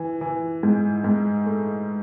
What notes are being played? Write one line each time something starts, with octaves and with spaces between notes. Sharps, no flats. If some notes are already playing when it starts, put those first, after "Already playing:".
Already playing: E3
E3
G#2
G#2
A3